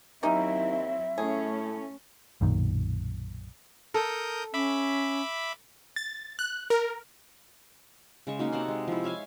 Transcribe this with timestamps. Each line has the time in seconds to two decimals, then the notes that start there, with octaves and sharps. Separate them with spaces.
0.23 D#2 F#3 C4 C#4 D#4 E4 E5
1.18 A2 A3 C#4 G#4
2.41 B1 F#2 A#2 D#3
3.94 A4 A#4 D#6 G6
4.54 C#4 E5 B5 D6
5.96 A6
6.39 F#6
6.70 A#4
8.27 C#3 G#3 C#6
8.39 A#3 C#4 D#4 F#4
8.52 C3 A4 F#5 C6
8.68 G#3
8.88 F3 E4
9.04 C#5 E5 F5 G#5